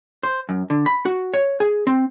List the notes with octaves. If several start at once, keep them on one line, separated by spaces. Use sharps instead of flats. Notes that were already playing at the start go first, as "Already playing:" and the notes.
C5
F#2
D3
B5
F#4
C#5
G#4
C4